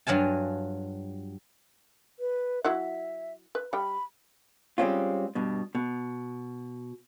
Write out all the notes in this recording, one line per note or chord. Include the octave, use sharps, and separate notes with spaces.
G2 F#3 F4 G#5 A5
B4
F#3 E4 E5 F#5
B4
G3 G5 B5
G3 G#3 A#3 C4 C#4 F4
G2 B2
B2